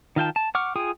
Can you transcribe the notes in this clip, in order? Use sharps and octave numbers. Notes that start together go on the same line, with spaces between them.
D#3 F4 G5 A5
A5
F#5 C#6 D6 F6
F4 G#4 G5 G#5 D#6